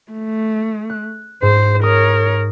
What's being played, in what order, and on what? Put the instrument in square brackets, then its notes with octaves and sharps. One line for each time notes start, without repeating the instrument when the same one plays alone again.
[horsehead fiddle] A3
[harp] F#6
[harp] G#2 [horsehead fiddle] C5
[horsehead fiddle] A#4 C#5 [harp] D#6